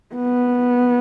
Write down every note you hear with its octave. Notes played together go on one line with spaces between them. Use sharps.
B3